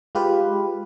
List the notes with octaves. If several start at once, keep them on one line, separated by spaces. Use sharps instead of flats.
G#3 F4 G4 B4